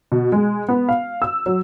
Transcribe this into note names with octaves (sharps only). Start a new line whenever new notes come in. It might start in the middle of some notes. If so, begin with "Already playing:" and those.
B2
G#3
B3
F5
E6
F#3